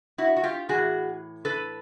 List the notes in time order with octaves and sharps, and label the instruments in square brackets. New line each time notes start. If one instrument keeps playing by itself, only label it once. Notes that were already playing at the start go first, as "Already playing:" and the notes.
[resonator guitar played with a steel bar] E4 F#4
F#4
F4 G4
A2 E3 F#4 G#4
A4 B4